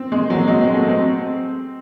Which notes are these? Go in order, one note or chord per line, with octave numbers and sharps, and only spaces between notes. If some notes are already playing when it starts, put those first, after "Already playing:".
Already playing: C4
G#3
F#3
G#3
C4
A3
C4